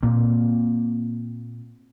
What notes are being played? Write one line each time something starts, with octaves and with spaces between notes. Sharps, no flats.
A#2 A#3 C4